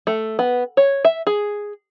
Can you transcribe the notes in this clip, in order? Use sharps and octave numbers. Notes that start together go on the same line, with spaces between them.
A3
B3
C#5
E5
G#4